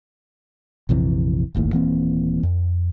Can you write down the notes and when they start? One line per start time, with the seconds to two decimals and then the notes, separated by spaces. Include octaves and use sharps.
0.89 A#1 F2 C3 E3
1.55 D1 G1 D#2 A2
1.72 D#1 E3 A#3 C4
2.43 F2